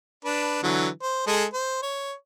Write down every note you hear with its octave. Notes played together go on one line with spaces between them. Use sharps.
D4 B4
D3 E3 F#3
C5
G#3 G#4 A4
C5
C#5